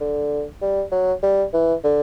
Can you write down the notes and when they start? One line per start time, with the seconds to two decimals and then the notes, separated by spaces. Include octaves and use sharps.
0.01 D3
0.62 G3
0.92 F#3
1.23 G3
1.53 E3
1.84 D3